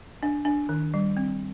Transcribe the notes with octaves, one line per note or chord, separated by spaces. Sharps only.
D4
D4
D#3
G3
C4